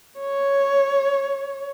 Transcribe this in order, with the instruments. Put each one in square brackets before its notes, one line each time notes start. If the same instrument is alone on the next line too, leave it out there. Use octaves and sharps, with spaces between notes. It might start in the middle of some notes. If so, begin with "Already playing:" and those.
[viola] C#5